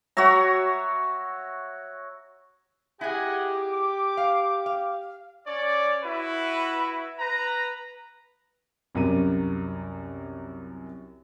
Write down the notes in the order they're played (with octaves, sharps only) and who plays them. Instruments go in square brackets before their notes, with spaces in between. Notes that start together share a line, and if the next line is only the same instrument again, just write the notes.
[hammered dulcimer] F#4 C#5 E5 A#5
[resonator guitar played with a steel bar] E4 G#4 [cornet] G4 [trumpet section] D#5 F#5 G#5
[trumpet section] D6
[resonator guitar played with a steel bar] F5
F5
[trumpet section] C#4 C#5 D5
E4 F#4 B4
B4 A#5
[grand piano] C2 F#2 G4 A#4 D#7